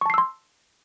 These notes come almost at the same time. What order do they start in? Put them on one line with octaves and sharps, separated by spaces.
C#6 A5 C7 E6 C6